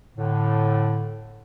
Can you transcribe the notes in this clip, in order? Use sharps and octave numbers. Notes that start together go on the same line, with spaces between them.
A2 D3